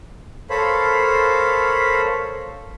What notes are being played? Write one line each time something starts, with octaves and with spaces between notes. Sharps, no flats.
A4 A#4 C5 C#5 F5 B5